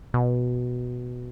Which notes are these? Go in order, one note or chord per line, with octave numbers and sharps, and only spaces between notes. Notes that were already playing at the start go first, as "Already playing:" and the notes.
B2